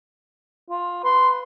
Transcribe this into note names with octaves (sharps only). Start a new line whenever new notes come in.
F4
B4 C6